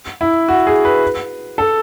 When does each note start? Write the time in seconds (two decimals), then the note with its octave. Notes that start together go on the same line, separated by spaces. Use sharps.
0.21 E4
0.48 F#4
0.67 G#4
0.85 B4
1.58 A4